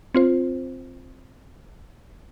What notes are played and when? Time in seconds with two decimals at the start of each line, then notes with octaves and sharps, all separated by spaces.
0.15 C4 F4 C5